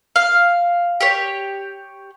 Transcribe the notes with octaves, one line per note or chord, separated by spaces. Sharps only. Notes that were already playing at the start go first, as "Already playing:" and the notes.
F5
G4 C#5